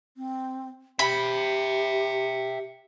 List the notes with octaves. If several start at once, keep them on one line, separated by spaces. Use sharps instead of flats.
C4
G4 E5 G5 B5